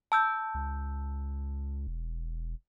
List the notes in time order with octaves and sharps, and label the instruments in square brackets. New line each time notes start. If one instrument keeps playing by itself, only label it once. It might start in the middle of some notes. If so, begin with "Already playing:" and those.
[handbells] A5 E6 G6
[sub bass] C#2
E1